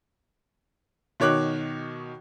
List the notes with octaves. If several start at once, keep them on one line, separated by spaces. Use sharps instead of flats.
B2 D#3 C#5 D6 F#6